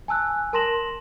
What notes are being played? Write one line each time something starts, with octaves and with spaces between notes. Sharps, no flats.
G#5 A5 E6 F#6
A#4 A5 C6 A#6 E7 F#7